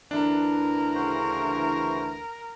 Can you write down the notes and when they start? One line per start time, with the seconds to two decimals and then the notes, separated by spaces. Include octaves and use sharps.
0.11 D2 E3 D4 A#4
0.95 C#3 F#4 C5